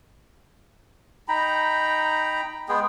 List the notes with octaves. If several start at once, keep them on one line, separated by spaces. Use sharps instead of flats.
D#4 G5 A#5 B5
G#3 B3 G#4 G5